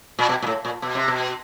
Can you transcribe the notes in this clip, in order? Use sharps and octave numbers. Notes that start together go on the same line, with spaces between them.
A#2
B2
A#2
A2
A#2
B2
C3
B2